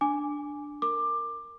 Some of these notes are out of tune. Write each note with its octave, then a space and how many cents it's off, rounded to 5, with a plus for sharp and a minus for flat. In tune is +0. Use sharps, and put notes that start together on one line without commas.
D4 +0 G#5 +0 D6 +0
A#4 -15 D6 +15